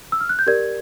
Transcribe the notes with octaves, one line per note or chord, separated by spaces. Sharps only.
E6
F6
F#6
G6
G4 A#4 D5 G#6